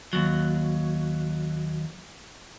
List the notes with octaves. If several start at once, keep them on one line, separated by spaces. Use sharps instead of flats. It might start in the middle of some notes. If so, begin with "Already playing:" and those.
D#2 F#3